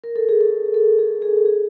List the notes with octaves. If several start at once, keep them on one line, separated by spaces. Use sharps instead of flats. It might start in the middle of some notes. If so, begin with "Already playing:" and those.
A#4
A4
G#4
A4
A4
G#4
G#4
G#4